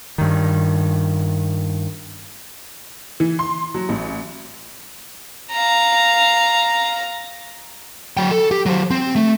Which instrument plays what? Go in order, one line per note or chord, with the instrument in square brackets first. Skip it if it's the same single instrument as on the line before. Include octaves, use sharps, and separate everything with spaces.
[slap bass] G2 D#3
[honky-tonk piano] E3
C6
F#3
A1
[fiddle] F5 A#5
[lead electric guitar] F#3 G5
A4
G4
F#3 C5
C4
A3